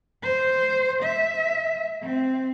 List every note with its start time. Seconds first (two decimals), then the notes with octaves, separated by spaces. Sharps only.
0.23 C5
1.03 E5
2.02 C4